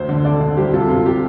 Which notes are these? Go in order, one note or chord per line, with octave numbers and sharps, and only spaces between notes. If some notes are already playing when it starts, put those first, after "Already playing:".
Already playing: D2 C5
D3
D3 A4 D5
D3
C2 G4 C5
C3 F4 A4
C3 F4
G4